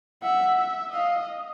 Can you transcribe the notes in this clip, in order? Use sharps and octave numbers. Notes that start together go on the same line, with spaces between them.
E5 F#5
E5
D#5 F5